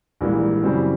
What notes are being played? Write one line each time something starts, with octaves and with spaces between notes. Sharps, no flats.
A#1 G#2 E3 G3 A#3
F#2 C#3 E3 G3 C4